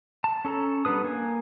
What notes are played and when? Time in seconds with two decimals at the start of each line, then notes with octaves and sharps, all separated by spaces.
0.24 A5
0.45 C#4 A4 A5 A#5
0.85 G3 B3 D4 B4 D#6
1.04 A#3 G#5